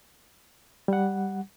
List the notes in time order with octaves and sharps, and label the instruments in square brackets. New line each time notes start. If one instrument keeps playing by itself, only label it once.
[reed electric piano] G3 F#5